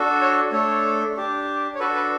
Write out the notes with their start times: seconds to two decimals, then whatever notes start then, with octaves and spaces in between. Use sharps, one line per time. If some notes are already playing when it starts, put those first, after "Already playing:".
Already playing: D4 F#4 A4
0.21 C#5
0.52 A3 D4 A4 C#5
1.16 D4 G4
1.75 C#5
1.79 D4 F#4 A4 B4
1.95 B4